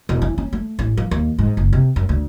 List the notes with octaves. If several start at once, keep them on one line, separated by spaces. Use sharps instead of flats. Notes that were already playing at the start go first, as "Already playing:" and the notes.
E1
E3
C#4
A3
A1
F3
D#2
G#2
F#1
C3
F#2
D2